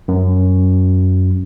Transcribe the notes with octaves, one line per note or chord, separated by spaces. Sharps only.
F#2